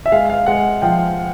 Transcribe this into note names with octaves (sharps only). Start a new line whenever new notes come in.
E5
G#3 F5
F5
G#3 F#5
F3 G5